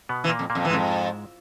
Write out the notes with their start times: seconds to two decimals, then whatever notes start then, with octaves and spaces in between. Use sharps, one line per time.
0.09 B2 B3
0.24 E3
0.29 A#2 A#3
0.39 F2
0.50 A#2 A#3
0.55 F2
0.65 E3
0.70 F2 G#2 G#3